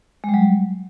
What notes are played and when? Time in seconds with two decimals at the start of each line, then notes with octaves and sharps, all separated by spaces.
0.24 G#3
0.29 G3
0.34 F#3